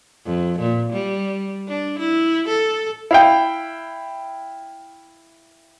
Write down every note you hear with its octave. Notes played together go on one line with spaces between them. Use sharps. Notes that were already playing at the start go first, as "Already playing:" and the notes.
F2
A#2
G3
D4
E4
A4
E4 F5 G5